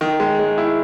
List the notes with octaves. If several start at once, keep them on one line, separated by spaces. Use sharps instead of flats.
D#3
G#3
G#3
E4